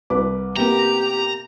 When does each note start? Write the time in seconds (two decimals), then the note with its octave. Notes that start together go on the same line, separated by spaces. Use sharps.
0.10 C2 B4 D6
0.56 C3 A#3 B3 G4 A#5